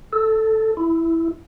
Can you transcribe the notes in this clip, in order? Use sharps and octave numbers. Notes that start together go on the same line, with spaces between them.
A4
E4